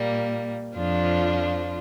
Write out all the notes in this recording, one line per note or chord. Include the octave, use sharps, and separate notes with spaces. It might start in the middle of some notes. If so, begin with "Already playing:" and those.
Already playing: A#2 G3 A#3
F2 F3 D4 F4